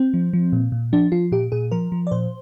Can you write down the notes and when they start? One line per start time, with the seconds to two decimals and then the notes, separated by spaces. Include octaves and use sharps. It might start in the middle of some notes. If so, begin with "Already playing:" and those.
Already playing: C4
0.14 F3
0.33 F3
0.53 A#2
0.72 A#2
0.93 F3 D4
1.12 F3 F4
1.32 A#2 G4
1.52 A#2 G#4
1.71 F3 A#4
1.92 F3
2.07 D5
2.11 A#2 C5